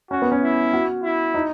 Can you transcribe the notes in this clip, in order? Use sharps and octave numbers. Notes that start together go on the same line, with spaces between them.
C#4 F#4
B3
C#4
E4
F#4
E4
D#4